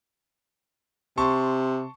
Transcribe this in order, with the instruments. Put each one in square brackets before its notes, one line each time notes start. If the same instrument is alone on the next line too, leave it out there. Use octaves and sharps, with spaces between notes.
[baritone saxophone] C3 [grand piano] A5 C6 C#6